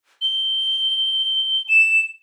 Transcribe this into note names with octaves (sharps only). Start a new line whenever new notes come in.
G7
E7